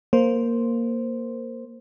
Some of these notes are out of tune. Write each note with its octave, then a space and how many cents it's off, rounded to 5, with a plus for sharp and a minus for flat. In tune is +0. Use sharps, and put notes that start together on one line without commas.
A#3 +0 C5 +0